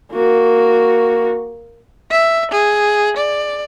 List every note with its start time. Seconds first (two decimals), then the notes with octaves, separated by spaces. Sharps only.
0.12 A#3 F#4
2.11 E5
2.51 G#4
3.17 D5